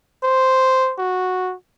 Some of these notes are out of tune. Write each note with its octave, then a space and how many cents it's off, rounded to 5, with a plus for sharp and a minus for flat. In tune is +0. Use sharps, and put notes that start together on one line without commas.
C5 -5
F#4 -10